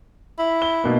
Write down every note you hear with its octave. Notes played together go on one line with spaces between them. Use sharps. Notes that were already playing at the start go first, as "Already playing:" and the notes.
E4
G7
B2 A#3